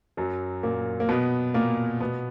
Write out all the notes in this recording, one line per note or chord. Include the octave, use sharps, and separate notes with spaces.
F#2 F#3
A#2 A#3
A#3
B2 B3
A#2 A#3
B2 B3